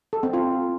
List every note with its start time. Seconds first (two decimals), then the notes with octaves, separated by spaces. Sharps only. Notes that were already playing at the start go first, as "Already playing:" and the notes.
0.13 A4
0.23 C4
0.33 F4